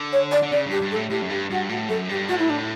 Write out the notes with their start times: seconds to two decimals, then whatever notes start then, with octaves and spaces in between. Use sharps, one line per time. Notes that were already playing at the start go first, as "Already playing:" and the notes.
Already playing: D3
0.12 C#5
0.31 D5
0.42 D3
0.51 C#3 D5
0.66 G2 G4
0.81 G2
0.91 A4
0.96 A2
1.10 A2 G4
1.22 F#2
1.30 G2 G4
1.50 G2 F#4
1.69 A2 F#4
1.89 F#2 A4
2.09 G2 G4
2.28 A2 F#4
2.38 E4
2.49 D4